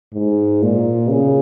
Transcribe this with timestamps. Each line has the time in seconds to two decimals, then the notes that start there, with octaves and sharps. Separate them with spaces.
0.13 G#2
0.62 A#2
1.10 C#3